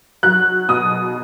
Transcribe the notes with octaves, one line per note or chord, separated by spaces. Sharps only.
F#3 F#6
B2 D#6